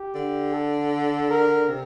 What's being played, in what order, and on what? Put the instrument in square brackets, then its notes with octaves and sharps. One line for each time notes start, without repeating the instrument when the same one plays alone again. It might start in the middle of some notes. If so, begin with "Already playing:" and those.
Already playing: [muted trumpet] G4
[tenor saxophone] D3
[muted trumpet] A4
A#4
[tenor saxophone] C3